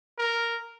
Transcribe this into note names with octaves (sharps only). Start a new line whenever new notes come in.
A#4